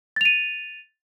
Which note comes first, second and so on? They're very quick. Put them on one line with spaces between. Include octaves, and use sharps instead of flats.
A6 F7 D#7